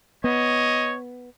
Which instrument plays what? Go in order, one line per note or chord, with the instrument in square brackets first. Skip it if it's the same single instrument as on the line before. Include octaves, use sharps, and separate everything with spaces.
[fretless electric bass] B3 [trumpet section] C#5 D#5